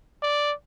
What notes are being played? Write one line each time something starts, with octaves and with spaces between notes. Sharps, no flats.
D5